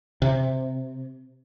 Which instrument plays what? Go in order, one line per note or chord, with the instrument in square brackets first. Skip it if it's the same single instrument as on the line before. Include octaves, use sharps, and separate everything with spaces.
[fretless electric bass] C3